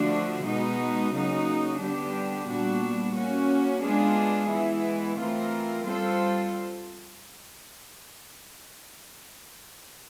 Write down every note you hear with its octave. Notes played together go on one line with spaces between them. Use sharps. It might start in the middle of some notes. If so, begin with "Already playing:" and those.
Already playing: D3 F3 A3 D4 F#4
B2 G#3 B3 D#4 F#4
C#3 F#3 A#3 D#4 F#4
D3 G3 B3 D4 G4
A#2 G3 B3 D4 F#4
A#3 C#4 F#4
G#3 B3 D4 F4 G#4
E3 G#3 B3 E4
E3 A3 C4 F4 A#4
G3 C4 F4 A4 C5